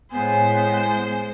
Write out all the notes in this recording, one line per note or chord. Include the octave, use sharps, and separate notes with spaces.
A2 G#3 B3 C5 G#5